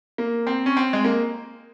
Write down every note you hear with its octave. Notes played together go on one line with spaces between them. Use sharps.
A#3
C4
C#4
C4
G#3
A#3